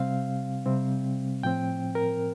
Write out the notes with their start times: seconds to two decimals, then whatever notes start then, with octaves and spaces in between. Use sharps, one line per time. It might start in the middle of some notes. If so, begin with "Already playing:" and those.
Already playing: C3 G3 C4 F5
0.66 C3 G3 C4
1.43 A2 F3 C4 G5
1.95 A#4